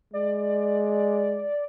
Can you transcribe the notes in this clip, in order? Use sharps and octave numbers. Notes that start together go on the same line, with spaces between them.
G#3 D5